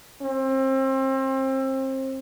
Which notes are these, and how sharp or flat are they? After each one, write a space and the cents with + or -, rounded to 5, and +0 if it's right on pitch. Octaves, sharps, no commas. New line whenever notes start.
C4 +30